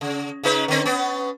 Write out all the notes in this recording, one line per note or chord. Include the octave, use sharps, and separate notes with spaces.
C#3
C#3 D#4 B4
D3 C4
B3 C#4